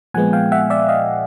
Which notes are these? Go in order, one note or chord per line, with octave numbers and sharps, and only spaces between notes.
A#2 F3 G#3 B3 F#5 G#5
F5 G5
E5 F#5
D5 E5
D#5 F5